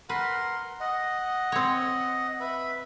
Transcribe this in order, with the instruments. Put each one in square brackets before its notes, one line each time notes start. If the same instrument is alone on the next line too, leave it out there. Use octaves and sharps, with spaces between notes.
[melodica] A#4 F#5 C6 [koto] B4
[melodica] D#5 F#5
[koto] C4 C#5
[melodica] B4 E5 B5